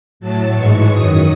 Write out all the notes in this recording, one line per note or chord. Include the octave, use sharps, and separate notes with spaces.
A2 F#3 A5
G#2 E3 G#3 C#6
F#2 D#3 F#3 D#6